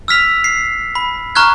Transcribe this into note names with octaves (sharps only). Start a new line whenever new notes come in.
E6 F6 B6 F7
C7
B5
A#5 C#6 F6 F#6 G#6